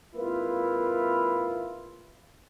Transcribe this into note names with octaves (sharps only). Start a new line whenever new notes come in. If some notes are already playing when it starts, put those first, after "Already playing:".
G#1 A#3 E4 F4 B4